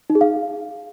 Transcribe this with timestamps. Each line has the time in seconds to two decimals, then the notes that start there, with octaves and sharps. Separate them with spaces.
0.10 D#4
0.15 G#4
0.21 F5